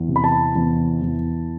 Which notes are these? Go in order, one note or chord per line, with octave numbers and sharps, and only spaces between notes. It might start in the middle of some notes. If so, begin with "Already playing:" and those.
Already playing: E2
C3
B5
A5
E2
E2